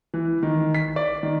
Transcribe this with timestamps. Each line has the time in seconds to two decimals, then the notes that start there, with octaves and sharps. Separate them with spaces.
0.14 E3
0.43 D#3
0.75 B6
0.96 D5
1.23 D#3